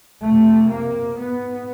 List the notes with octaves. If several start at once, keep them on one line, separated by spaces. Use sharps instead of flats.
F2 C3 A3
A#3
G#2 B3